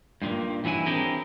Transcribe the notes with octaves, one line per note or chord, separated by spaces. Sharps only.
G2 A#2 D#3
G2 E3 F#3 E4 G#5
C4 D4 E4 G4 G#4 A#4